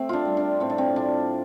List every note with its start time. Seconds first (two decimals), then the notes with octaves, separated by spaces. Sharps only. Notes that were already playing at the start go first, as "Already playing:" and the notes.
Already playing: A3 C4
0.09 D4 F4
0.25 G3
0.37 D4
0.60 A2 C4
0.70 D4
0.78 C4
0.96 A2 D4